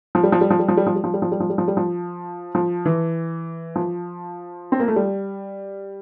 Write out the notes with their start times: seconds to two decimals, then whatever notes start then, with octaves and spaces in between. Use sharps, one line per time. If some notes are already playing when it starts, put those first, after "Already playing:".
0.15 F3
0.24 G3
0.32 F3
0.41 G3
0.51 F3
0.59 G3
0.68 F3
0.77 G3
0.87 F3
0.96 G3
1.04 F3
1.14 G3
1.22 F3
1.32 G3
1.40 F3
1.50 G3
1.58 F3
1.68 G3
1.77 F3
2.55 F3
2.86 E3
3.76 F3
4.72 C4
4.80 A#3
4.88 A3
4.96 G3